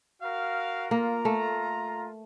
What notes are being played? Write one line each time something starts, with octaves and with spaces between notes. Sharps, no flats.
F#4 A#4 F5
A#3 F4 A#5
A3